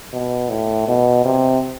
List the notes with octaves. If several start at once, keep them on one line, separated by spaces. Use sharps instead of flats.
B2
A2
B2
C3